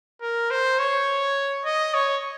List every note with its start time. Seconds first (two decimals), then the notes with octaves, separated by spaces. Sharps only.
0.22 A#4
0.51 C5
0.79 C#5
1.65 D#5
1.94 C#5